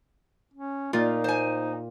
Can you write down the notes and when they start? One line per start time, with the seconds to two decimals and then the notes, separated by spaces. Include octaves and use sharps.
0.54 C#4
0.93 A#2 D#4 F4
1.24 C5 G#5